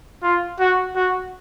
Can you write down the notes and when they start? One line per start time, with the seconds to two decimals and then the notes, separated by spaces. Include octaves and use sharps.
0.23 F4
0.59 F#4
0.95 F#4